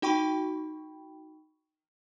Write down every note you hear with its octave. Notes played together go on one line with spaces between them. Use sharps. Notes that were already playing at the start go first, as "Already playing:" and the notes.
D#4 F#4 G5 B5 C#6